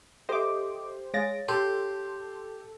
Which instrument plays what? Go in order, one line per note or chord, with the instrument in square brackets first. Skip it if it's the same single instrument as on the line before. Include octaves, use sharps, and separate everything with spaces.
[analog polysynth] G4 C5 [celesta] A4 E5 [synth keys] D#5 D6
[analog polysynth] G#3 [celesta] C#5 F5 [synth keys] A6 A#6 D7
[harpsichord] G4 [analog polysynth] A4 [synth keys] C6